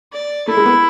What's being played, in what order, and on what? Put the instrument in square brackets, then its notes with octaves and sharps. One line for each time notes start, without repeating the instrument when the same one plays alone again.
[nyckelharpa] D5
[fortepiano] A3 [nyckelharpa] E4
[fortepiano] G#3
B3